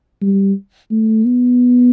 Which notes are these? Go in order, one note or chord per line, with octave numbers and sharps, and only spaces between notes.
G3
A3
B3